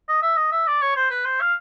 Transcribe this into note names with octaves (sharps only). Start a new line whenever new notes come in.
D#5
E5
D#5
E5
D5
C#5
C5
B4
C5
F5